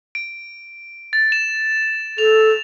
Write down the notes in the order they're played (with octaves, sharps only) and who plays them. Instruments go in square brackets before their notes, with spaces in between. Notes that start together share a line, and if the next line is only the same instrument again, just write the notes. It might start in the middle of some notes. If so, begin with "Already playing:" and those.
[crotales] D7
A6
E7
[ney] A4 [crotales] F7